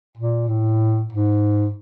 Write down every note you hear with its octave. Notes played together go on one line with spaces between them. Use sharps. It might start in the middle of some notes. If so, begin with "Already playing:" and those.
A#2
A2
G#2